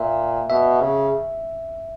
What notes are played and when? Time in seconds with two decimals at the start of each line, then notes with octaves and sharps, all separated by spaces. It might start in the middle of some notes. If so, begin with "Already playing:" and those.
Already playing: A#2 E5
0.50 B2 E5
0.81 C#3